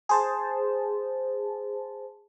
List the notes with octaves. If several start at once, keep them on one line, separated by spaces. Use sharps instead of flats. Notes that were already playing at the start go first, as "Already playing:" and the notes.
G#4 C5 A5